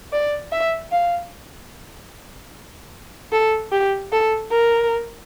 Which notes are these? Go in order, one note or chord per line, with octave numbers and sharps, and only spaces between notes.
D5
E5
F5
A4
G4
A4
A#4